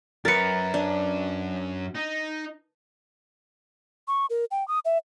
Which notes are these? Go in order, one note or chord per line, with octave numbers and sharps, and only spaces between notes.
F#2 A#4 B4 A6 C#7
D4
D#4
C#6
A#4
G5
D#6
E5